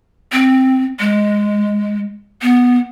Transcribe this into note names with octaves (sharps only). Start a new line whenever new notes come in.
C4
G#3
B3